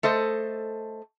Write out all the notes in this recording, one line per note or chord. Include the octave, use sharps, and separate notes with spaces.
A3 A4 C5 D#5